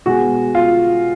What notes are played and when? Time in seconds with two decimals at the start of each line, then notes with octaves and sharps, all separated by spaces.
0.06 B2 G#3 F#4
0.55 F4